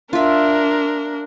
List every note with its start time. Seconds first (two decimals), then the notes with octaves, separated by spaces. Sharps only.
0.13 D4 F4 A#4 E5